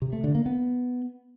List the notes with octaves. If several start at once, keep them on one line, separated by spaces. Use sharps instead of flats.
C3
A3
D3
A#3
B3